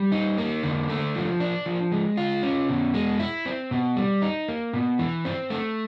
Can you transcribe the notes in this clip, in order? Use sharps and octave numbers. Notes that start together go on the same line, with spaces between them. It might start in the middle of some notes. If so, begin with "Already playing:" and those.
Already playing: G3
D#4
A#3
D3
A3
F3
D4
F3
G#3
F4
C#4
B2
G#3
E4
C4
B2
G3
D#4
A#3
B2
E3
C4
A3